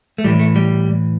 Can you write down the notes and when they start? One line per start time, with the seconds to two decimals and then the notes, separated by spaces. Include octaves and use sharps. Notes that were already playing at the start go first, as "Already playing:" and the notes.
0.18 A3
0.24 A2 E3 G3
0.39 A3
0.56 G3